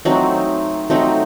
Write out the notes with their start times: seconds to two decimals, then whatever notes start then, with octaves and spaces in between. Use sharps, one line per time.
0.05 F#3 A3 C4 D#4
0.90 F#3 A3 C4 D#4